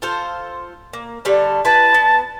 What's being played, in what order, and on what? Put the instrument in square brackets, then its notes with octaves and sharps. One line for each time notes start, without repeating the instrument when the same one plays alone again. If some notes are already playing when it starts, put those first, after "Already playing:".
[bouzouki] F4 A4 C5
A#3
D3 G3 A3
[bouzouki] E4 B4 [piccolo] A5
[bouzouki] B3